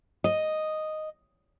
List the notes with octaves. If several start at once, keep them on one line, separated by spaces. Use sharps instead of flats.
D#5